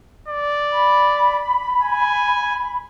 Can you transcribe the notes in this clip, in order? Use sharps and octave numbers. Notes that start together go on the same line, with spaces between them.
D5
B5
G#5